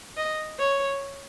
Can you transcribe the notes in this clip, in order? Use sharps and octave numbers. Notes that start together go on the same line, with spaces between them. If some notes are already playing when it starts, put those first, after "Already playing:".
D#5
C#5